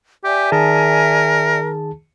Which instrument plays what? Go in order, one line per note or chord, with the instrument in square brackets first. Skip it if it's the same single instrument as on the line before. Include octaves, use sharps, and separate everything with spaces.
[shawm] G4 [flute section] D5 E5 G#5
[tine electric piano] D#3 G#4 A5 [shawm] A#4